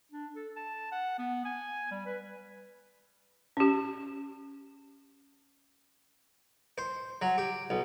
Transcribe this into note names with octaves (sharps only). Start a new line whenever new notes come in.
D4
A4
A5
F#5
B3
G#5
G3
B4
C#4 G4
C5
F#3
G4
B1